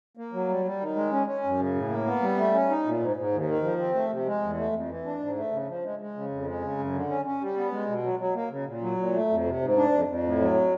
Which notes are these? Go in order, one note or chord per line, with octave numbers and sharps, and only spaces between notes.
A#3
F#3
G3
G3
D#3
G#3
C#4
C#4
F#2
C#3
A2
A#3
B3
G3
A3
C#4
D#4
A#2
G#2
G#2
D#2
D#3
F3
C4
A3
C3
G#3
E2
A3
F2
E3
D4
G#2
A3
C#3
F3
G#3
G#3
C#3
F2
G#3
C#3
F#2
D3
C#4
C#4
G3
B3
G#3
B2
F#3
F#3
A#3
C#3
A#2
F#3
A#2
A3
F2
C3
G#2
D4
F2
F2
A2
F#3